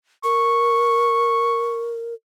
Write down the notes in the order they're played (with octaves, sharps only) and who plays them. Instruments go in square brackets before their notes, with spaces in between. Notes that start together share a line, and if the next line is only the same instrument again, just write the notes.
[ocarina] A#4 [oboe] C#6